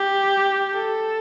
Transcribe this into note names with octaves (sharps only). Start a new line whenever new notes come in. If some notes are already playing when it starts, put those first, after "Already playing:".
Already playing: G4
A4